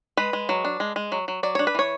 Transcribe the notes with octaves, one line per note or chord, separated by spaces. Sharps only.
G#3 B4
G#3
F#3
D4
G#3
G#3
F#3
F#3
F#3 D5
D4 C#5
B4
E3 C#5